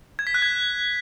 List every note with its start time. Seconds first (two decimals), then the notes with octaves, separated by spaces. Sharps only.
0.19 G#6
0.27 B6
0.34 F#6
0.42 G#6